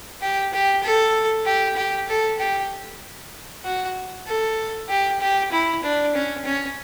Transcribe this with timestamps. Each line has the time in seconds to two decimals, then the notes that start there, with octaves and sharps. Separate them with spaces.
0.21 G4
0.53 G4
0.83 A4
1.45 G4
1.77 G4
2.08 A4
2.39 G4
3.65 F#4
4.27 A4
4.89 G4
5.20 G4
5.52 E4
5.83 D4
6.15 C#4
6.45 C#4